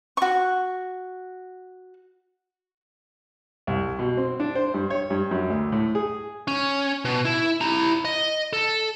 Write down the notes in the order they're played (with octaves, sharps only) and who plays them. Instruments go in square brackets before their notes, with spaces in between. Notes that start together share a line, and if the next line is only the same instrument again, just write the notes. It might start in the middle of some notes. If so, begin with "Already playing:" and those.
[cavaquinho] F#4 C#6
[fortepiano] C2
B2
C4
D4
C5
G2
C#5
G2
F#2
D2
A2
G#4
[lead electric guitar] C#4
B2
E4
E4 A#5
D#5
A4